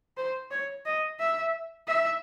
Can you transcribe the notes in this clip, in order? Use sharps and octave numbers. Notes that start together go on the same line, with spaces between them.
C5
C#5
D#5
E5
E5